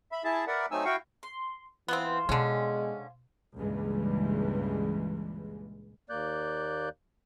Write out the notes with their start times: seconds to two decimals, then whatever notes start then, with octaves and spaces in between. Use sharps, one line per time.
0.12 E5 B5
0.24 E4 G#4 E5 A5
0.47 A#4 B4 D5 E5 F#5
0.71 F#3 A3 C4 D#4 G#5 E6
0.85 E4 F#4 F5 G5 C#6
1.23 C6
1.88 E3 B3 C4 F4 C5
2.29 B2 D3 G#3 C#4
3.57 C#2 G2 A#2 E3 G3 G#3
6.10 D#2 A#3 D5 F#6 G6